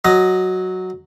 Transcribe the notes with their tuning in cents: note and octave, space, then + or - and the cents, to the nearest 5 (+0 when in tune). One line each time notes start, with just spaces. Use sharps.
F#3 +0 D#5 +0